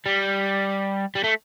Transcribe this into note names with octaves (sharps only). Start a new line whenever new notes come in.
G3
G3
A3